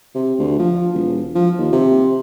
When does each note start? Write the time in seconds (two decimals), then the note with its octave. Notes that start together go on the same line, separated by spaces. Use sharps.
0.15 C3
0.39 D2
0.59 F3
0.94 E1
1.35 F3
1.58 D#2
1.72 C3